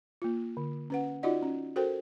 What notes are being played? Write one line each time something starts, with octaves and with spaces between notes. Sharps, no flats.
A#3 F4
D3
C#4 B4 F#5
D#4 F4 F#4 D5 D#5 F#5
C#4
F#4 A4 A#4 C5 G5